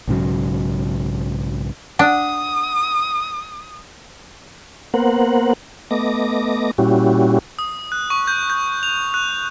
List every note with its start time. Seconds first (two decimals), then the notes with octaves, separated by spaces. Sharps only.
0.08 B1 G#2 C#3 F#3
1.99 D4 F#5 D#6
4.94 A#3 B3 A#4 C5 F#5
5.91 A3 B3 D#5 D6 A#6
6.78 A#2 G3 C#4 E4 F#4 G4
7.59 D#6
7.92 F#6
8.10 C#6
8.27 G6
8.50 G6
8.83 F7
9.14 F#6